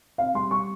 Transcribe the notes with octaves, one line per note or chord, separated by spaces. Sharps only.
C3 F5
G3 C6
G3 C#6